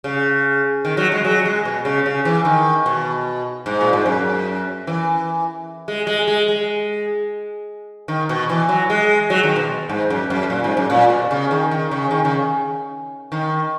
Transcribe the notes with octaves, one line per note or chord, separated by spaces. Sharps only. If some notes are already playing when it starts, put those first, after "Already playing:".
C#3
D#3
F#3
G#3
F#3
G#3
B2
C#3
C#3
E3
D#3
B2
G#2
A#2
G#2
F#2
E3
G#3
G#3
G#3
G#3
D#3
B2
E3
F#3
G#3
F#3
D#3
B2
G#2
F#2
F#2
A#2
G#2
F#2
A#2
B2
C#3
D#3
D#3
C#3
D#3
C#3
D#3